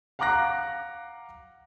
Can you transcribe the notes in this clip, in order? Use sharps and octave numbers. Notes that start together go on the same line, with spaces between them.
F5 F#5 A#5 D6 F#6 A#6